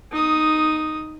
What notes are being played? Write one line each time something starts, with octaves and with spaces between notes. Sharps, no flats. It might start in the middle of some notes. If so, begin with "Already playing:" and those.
D#4 D#6